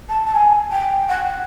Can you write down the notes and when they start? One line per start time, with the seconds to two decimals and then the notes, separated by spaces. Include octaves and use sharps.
0.09 A5
0.26 A5
0.34 G#5
0.71 G5
1.08 F#5